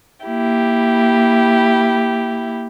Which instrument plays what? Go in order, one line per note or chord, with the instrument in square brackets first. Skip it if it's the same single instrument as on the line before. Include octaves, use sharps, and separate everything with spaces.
[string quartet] A#3 E4 G4